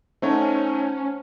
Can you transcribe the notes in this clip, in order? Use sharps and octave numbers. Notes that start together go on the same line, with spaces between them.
A3 C#4 D#4 C5 C#5 F#5 A5